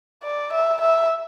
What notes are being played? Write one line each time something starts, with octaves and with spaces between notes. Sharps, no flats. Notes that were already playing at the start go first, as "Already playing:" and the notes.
D5
E5
E5